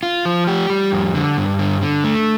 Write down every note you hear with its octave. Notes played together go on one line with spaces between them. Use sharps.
F4
F3
G4
G3
F2
D3
G2
D3
D3
A3